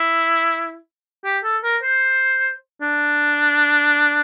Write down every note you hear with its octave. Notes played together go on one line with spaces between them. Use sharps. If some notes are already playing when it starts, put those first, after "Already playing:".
Already playing: E4
G4
A4
A#4
C5
D4